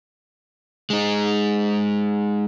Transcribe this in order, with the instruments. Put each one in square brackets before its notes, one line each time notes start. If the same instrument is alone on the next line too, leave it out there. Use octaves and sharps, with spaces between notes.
[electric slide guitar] G#3 D#4